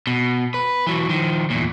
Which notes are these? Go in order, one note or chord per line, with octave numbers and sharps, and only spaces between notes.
B2
B4
E3 F#3
D#3 F3
E2 A#2